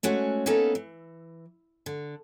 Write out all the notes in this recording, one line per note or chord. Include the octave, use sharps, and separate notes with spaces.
G#3 A3 C#4 F#4
A#3 B3 C#4 D#4 A4
E3
D3